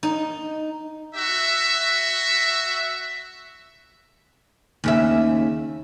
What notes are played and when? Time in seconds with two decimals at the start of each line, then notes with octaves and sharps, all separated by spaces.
0.03 D#4
1.15 F#4 E5
4.84 D#2 C#3 E5